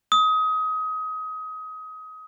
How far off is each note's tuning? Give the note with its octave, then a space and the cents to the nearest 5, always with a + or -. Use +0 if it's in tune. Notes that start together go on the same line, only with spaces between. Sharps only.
D#6 +25